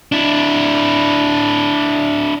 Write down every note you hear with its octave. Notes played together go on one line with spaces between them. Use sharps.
D4 E4